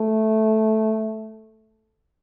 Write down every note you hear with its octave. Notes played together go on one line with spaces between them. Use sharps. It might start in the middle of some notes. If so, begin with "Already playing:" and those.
Already playing: A3